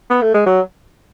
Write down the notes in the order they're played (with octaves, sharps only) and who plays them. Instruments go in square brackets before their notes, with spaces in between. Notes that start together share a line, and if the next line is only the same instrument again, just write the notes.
[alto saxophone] B3
A3
G#3
F#3